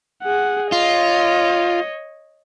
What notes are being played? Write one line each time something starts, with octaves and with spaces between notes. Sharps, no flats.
G#4 F#5
F4 C#5 D#5